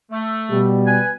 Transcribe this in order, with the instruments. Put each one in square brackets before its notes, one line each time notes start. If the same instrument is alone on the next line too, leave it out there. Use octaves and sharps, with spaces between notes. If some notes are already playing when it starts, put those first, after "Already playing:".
[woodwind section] A3
[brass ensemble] B2 G3
[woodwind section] B4 G#5